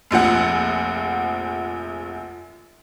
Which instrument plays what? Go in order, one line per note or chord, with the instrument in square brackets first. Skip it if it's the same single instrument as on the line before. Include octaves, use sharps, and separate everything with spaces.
[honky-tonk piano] F1 A#1 F3 F#5